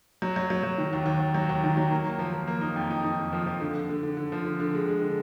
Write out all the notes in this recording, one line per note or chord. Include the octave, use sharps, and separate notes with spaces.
F#3
F#3
F#3
F#3
D#3
D#2
D#2
D#2
F#3
D#2
D#3
F#3
A#3
A#3
F3
F3
A#3
D#4
F2
D#4
D#4
F2
F3
F3
D3
D3
D3
D3
D3
F3
D3
D3
G#3
G#3
D3